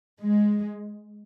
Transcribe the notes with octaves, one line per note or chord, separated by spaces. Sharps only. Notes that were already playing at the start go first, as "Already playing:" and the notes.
G#3